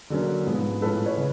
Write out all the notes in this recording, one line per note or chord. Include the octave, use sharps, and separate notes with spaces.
D3 F#3 A#3 C#4
G#2 F3 G#3 B3
A2 F3 G#3 C#4 A4 B4
B4 C#5
C#3